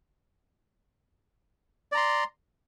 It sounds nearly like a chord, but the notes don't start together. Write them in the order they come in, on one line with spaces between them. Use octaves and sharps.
D5 A#5 C6